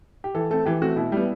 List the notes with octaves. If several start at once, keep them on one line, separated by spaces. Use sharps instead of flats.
G4
E3 A4
A3 C4 A4
E3 G4
A3 C4 F#4
B2 E4
G3 B3